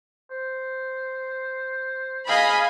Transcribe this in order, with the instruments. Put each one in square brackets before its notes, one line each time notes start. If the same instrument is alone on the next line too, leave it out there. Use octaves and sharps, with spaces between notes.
[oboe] C5
[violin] G#4 D#5 [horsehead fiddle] F5 G#5 [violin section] B5